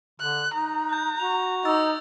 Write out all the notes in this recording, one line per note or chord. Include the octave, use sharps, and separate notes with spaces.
D3 F#6
D#4 A#5
F#6 G6
F#4 F7
D#4 D6 E6 A6